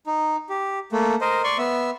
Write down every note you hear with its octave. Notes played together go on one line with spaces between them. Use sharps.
D#4
G4
A3 A#3
A#4 C5 D#5
D5 C6 C#6
B3 E5